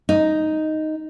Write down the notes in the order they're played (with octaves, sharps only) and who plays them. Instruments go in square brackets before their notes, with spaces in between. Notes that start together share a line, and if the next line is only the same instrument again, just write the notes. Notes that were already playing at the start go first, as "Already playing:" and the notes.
[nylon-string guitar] D#4